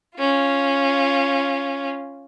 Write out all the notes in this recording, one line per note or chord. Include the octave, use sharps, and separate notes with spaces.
C#4 F4